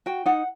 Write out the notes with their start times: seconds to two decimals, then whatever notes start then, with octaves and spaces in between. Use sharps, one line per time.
0.06 F#4 G5
0.26 D#4 F#5